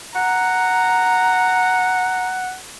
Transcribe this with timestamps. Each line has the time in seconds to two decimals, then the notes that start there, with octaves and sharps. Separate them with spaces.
0.15 F#5 A#5